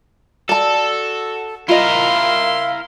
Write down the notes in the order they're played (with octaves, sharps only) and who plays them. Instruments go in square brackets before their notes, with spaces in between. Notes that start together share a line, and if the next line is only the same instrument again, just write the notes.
[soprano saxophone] F#4 [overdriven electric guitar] A4 [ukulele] D5 A5
[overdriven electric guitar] E4 A#4 [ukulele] F4 D#5 [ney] F5 [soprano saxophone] C6